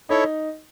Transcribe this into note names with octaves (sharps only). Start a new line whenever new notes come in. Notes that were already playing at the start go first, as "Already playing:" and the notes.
D#4 E4 A4 C#5